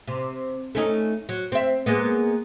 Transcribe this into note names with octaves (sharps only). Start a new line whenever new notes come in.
C3
A3 C#4 D#4
F#3
C4 E5
G#3 A#3 B3